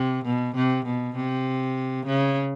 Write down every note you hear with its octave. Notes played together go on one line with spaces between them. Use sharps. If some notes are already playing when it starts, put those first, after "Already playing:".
Already playing: C3
B2
C3
B2
C3
C#3